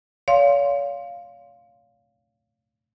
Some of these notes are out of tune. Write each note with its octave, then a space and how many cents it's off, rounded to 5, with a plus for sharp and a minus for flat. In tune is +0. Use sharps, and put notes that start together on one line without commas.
C#5 +40 F5 +0 C6 +0